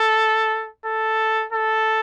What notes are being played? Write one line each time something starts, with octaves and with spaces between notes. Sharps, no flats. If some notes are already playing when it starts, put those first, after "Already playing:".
Already playing: A4
A4
A4